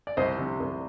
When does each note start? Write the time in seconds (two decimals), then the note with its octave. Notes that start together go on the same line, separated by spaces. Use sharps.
0.07 D5
0.17 C2 C5 D#5
0.38 C3
0.60 C2